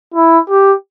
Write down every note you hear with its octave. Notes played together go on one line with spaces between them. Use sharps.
E4
G4